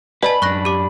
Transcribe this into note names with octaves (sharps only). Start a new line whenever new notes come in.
B4 D5 D#5 A5 B5
F#2 D4 C#6 F#6 A#6
G4 D6